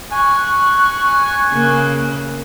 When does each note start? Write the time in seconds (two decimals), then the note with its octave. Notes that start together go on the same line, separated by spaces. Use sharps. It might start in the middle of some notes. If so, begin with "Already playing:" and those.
0.11 G#5 C#6 F#6
1.52 C#3 A#3